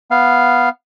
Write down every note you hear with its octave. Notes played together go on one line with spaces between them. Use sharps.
B3 F5